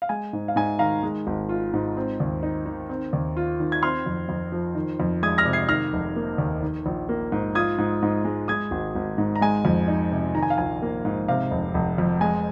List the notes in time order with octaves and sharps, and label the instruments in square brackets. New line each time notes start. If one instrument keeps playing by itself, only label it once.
[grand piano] F5
G#3 G#5
G#2
F5
G#2 G#5
D#3 F5 A#5
G#3
G#1
F4
G#2
C4
D#2
D#4
D#3
C4
D#2
F4
D#3
G#6
C4 C6 F6
F2
F2
F3
D#3
F2
G#3 D#6 G#6
F6 A#6
C3
G#6 C7
D#3 F6 A#6
F1
A#3
D#2
D#3
A#1
A#3
G#2
F4 D#6 G#6
G#2
G#2
G#3
G#3 D#6 G#6
G#1
G#1
G#2
A#5
G#3 G#5
F2
D#4
C3
D#3 A#5
G#5
F5
A#1 G#5
A#3
G#2
C3 F5
F1
F1
F2
G#3 G#5